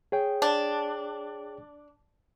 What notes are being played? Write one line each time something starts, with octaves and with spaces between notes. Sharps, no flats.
G#4 C#5 G5
D4